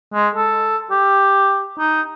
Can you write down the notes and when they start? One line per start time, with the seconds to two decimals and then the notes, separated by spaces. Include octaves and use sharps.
0.14 G#3
0.35 A4
0.91 G4
1.79 D#4